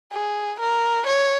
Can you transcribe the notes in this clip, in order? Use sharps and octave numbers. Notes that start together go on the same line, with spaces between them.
G#4
A#4
C#5